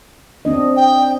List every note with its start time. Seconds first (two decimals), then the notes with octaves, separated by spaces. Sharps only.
0.45 C4 D4 D#5
0.76 G5